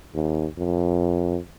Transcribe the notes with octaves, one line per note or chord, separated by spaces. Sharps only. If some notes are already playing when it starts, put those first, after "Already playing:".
D#2
F2